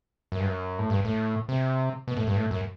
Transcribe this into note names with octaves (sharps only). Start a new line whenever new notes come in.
F#2
G2
F#2
A2
G2
A2
C3
B2
A2
G2
A2
F#2